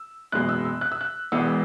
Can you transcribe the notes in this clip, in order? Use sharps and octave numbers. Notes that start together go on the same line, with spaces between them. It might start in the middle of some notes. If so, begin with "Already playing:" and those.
Already playing: E6
F#1 E2 B2 G#3 F#6
E6
E6
F#6
E6
F#6
E1 E2 E3 G#3 B3 E6